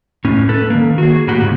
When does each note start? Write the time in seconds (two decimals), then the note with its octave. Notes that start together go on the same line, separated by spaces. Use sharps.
0.25 A2 C#4
0.49 A4 B4
0.70 D#3 A#3
0.98 F#4 G#4
1.27 A2 A#3 F#4 G4
1.41 G#2 C#3